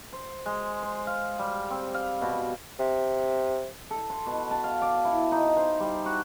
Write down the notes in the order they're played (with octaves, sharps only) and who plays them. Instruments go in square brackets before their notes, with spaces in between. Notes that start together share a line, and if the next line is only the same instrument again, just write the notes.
[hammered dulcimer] C5
G#3
C5
F5
G3
C4
F5
B2
[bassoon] C3
[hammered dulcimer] A4
C6
B2
A5
F5
D5
E4
D#4
C5
G3
F#4